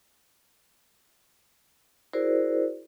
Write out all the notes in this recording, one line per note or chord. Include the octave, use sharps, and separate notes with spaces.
E4 F#4 G#4 A#4 C5 D5